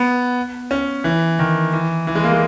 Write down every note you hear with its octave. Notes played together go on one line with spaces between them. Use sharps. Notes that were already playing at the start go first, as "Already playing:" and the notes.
Already playing: B3
C#4
E3
D#3
E3
E3
G#3
A#3
G#3